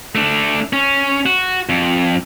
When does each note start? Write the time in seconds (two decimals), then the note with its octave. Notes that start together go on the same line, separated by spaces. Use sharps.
0.15 A3 D4
0.73 C#4
1.26 F#4
1.69 F2